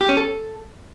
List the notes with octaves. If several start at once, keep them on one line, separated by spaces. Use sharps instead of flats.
G4
C#4
A4